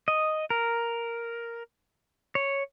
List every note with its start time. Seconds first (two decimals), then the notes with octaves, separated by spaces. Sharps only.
0.08 D#5
0.50 A#4
2.35 C#5